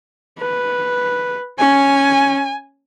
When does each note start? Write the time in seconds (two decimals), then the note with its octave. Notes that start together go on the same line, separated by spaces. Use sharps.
0.39 B4
1.59 C#4 G#5